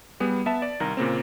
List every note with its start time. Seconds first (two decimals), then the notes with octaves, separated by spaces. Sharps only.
0.20 G3 B3 G#4
0.46 B3 E5 A5 E7
0.62 D5
0.80 C2 D#3 A#4 A#5
0.97 A#2 C#3 A#3 C4